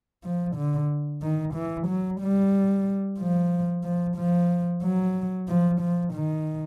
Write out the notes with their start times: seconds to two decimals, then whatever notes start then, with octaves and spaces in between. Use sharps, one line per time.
0.24 F3
0.56 D3
1.22 D#3
1.54 E3
1.88 F#3
2.21 G3
3.18 F3
3.84 F3
4.17 F3
4.82 F#3
5.48 F3
5.81 F3
6.13 D#3